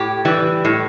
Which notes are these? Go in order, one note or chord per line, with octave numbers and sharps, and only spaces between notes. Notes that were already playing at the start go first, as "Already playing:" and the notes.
Already playing: A2 G4
E3 G3
A2